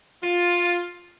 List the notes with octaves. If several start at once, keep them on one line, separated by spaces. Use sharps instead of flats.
F4